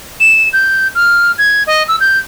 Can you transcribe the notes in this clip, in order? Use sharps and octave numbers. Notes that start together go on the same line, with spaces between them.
E7
G6
F6
G#6
D#5
E6
G6